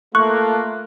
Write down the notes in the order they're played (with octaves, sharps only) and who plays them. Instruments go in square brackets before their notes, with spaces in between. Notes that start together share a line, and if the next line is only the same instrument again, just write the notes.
[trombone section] A3 [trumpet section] A#3 F4 [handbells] C#6 [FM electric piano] F#6